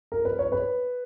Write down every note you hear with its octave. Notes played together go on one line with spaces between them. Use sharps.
A#4
B4
C#5
B4